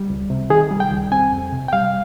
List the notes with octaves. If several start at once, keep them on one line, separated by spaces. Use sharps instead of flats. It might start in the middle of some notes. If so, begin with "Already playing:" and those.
Already playing: G3
C#2
C3
D#3 G#4
G3
G5
C#2
C4 G#5
F2
C3
G5
G3 F5